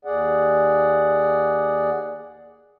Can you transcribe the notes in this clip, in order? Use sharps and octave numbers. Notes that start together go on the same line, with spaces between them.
D#2 G#4 D5 F#5